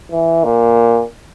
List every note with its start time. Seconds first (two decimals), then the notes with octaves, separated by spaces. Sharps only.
0.11 E3
0.44 A#2